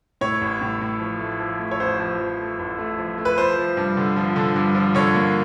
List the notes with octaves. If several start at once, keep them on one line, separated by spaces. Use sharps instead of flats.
A2 C#5
A1
A2
A2
F3
A3
F3
A3
C#5
A1 C5
F3
F3
A3
A1
A3
F3
A3
B4
F3 C5
F3
G2
D3
F3
D3
G2
F3
D3 C#5
A#3